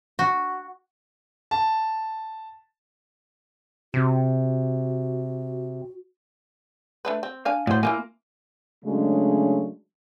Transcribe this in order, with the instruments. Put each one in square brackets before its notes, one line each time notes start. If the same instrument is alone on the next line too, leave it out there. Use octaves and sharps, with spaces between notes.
[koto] F#4
[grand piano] A5
[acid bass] C3 [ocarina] F#4
[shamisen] A3 D4 B4
C4
D4 F5 G#5
[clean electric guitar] A2 [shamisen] F#3 C5
[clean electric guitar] A#3 [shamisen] E4 F4 G#5
[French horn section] C#3 F#3 G#3 A3 D4